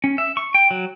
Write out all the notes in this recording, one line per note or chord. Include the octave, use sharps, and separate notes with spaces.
C#4
E5
C#6
G5
F#3